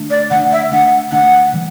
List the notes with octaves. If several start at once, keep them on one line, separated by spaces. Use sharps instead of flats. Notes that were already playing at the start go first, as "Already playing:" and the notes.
Already playing: D3 A3 D4
D5
D3 A3 D4 F#5
E5
D3 A3 D4 F#5
D3 A3 D4 F#5
E3 G3